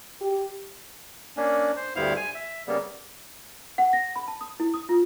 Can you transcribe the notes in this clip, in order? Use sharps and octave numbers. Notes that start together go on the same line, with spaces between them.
G4
A#3 C#4 D4
C5
D2 G2 B3 E4 C5 F5
G#5
E5
C#3 G3 A#3 B3
F#5
A#6
B5
A5
D#6
E4
D#6
F4